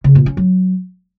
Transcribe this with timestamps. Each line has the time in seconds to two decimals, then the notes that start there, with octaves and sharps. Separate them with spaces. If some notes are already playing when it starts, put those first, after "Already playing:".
0.04 C#3
0.15 A#2
0.26 C#4
0.37 F#3